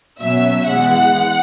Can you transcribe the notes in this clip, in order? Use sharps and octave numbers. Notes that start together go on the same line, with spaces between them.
B2 F#3 C#4 E5
E3 G#3 B3 F#5